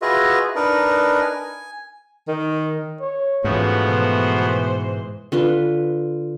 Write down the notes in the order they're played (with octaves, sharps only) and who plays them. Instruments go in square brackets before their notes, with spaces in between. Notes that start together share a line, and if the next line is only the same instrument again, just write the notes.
[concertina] F4 F#4 G#4 B4 D#5 E5
D4 D#4 A#4 B4
G#5
[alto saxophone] D#3
[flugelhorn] C#5
[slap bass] G#2 [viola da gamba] E3 C#4 [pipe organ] F3 B3 F#4 [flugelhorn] A3
[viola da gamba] B2 E3 C5
[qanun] D3 F4 B4